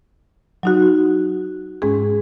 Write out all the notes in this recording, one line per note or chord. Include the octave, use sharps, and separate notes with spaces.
F#3 D#4 F#4
G#2 G#3 C#4 G#4